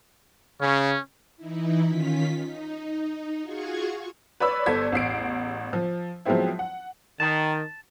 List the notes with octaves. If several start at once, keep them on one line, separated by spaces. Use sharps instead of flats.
C#3 C#4
E3 D#4 E4
D#3 C#4 F4 B6
D#4
F4 F#4 G#4 G#5 C#6
B4 C#5 D5 B5 E6
G1 A4 C5 D5 G#6 B6
A1 E2 C7 D7
F3
F3 F#3 G#3 B3 C4 E4
F#5
D#3 A5